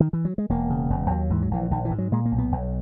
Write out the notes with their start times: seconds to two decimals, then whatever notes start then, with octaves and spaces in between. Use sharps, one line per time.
0.00 D#3
0.13 E3
0.25 F#3
0.38 G#3
0.49 E1 A#3
0.70 C#3
0.90 E1
1.10 D#2 F#3
1.30 G#2 E3
1.42 F#3
1.51 A#1 E3
1.71 A#1 D#3
1.85 E3
1.91 G#2
1.98 F#3
2.12 A#2 G#3
2.26 A#3
2.32 B1
2.38 B3
2.52 B1